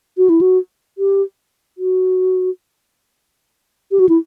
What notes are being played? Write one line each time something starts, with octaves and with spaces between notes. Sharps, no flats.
F#4
E4
F#4
G4
F#4
G4
F#4
E4